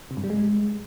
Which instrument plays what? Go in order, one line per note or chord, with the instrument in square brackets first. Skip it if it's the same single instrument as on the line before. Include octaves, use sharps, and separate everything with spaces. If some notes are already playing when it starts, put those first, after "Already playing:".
[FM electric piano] C3
G2
G3
G#3